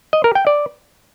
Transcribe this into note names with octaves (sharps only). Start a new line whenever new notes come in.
D#5
A#4
G5
D5